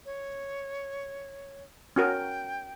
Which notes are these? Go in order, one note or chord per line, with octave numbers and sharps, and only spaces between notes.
C#5
C#4 F#4 A#4 G5